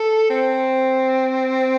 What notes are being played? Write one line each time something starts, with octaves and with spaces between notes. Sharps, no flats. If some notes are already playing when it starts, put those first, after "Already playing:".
Already playing: A4
C4